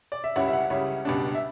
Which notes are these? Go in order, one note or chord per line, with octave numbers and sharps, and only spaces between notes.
D5
E5
C#2 C#3 G3 C#4 E4 F#5
E5
F#5
C#2 C#3 G3 C#4 E4
C#2 B2 G3 D4
E5